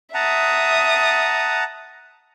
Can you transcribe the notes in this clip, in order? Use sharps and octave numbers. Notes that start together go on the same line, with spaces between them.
E5 F#5 A5 A#5 D#6